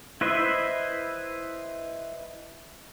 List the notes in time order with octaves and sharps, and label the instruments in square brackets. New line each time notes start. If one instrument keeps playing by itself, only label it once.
[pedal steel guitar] E4 B4 C5 D#5 E5